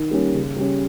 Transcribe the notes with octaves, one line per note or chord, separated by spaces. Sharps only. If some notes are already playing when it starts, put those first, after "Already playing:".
Already playing: D#3
G3 A#3 C#4
C#3
G3 C#4